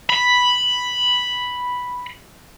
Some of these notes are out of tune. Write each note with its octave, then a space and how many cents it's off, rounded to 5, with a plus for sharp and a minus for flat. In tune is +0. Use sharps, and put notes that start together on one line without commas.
B5 +0